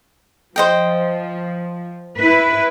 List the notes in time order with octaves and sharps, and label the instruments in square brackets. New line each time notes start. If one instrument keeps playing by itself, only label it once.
[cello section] F3 [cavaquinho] C5 D#5 G5
[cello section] E4 B4